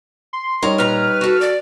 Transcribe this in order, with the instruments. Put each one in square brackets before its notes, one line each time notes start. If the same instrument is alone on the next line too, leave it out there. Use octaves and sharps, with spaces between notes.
[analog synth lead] C6
[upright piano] G3 D#4 C#5 [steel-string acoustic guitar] A#4
[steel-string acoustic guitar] A#2 A#5 [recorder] B4 [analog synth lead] F6
[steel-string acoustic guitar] F#4 A4
[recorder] D5